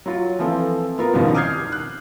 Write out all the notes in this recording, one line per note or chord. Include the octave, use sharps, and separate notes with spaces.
F#3 F4
E3 F3 C4 A4
B3 F4 A#4
C2 F#2 B2 D#3 F3 G3
D6 D#6 F6 G6 G#6 C7
F#6